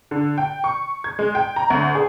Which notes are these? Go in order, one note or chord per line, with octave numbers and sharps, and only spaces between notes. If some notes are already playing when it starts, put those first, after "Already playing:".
D3
G5
C#6
G#6
G#3
G5
A#5
D2
G#4